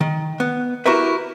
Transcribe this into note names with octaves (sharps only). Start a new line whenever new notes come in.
D#3
B3
E4 F#4 G4 A#4 B4 E5